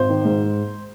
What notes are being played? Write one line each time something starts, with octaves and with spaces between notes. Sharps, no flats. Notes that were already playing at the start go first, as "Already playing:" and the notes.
Already playing: G#1 C5
D#3
G#2